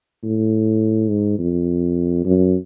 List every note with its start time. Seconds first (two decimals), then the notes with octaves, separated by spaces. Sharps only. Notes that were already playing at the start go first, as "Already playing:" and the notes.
0.23 A2
1.10 G#2
1.39 F2
2.25 F#2